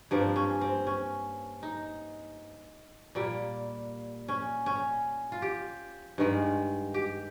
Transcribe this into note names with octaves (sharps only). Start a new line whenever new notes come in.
G2 F3 A#3 C4
C#4
C4
C#4
D#4
A#2 G3 A#3
C#4
C#4
F4
G4
G2 D#3 G#3
G4